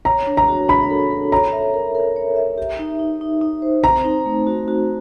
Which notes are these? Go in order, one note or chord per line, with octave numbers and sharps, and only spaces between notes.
C#5 A#5
D4
A#5
F#4
D4 B5
A4
A4
C#5 A#5
E5
A#4
A#4
C#5
E5
G4
D#4
D#4
D#4
D#4
C5
C4 A#5
D#4
A3
F#4
F#4